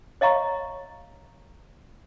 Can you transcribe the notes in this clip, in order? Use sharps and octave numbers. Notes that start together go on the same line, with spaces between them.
C#5 D#5 F5 A#5 C#6